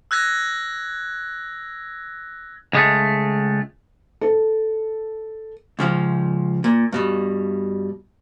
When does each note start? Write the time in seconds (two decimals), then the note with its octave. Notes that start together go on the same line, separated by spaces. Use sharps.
0.11 E6 F#6 G#6 A#6
2.73 C#2 G#3 A3
4.21 A4
5.79 C#2 C#3 F3
6.64 A#2
6.92 G2 B2 G3